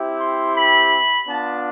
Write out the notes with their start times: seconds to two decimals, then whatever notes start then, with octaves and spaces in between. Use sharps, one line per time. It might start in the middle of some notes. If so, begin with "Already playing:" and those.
Already playing: C4 E4 G4
0.20 C6
0.56 B5
1.28 B3 D4 F4 A5